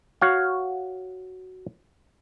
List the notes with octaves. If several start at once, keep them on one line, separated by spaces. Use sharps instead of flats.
F#4 C#5 F5